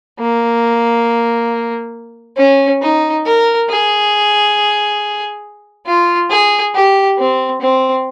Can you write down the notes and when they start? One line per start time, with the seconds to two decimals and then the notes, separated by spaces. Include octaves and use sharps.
0.20 A#3
2.37 C#4
2.81 D#4
3.25 A#4
3.69 G#4
5.86 F4
6.30 G#4
6.74 G4
7.18 C4
7.61 C4